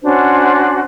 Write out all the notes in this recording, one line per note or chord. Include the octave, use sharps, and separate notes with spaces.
C#4 D4 F#4 C5